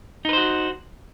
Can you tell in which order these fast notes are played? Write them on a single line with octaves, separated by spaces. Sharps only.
D#4 B4 C5 F#4